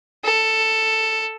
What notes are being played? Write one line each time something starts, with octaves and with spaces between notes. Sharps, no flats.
A4